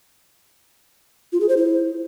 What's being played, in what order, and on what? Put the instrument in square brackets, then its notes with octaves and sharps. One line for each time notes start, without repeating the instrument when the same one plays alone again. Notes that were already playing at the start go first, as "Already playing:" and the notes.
[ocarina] F4
G#4
C5
E4